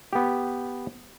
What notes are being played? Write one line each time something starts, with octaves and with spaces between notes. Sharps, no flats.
B3 G4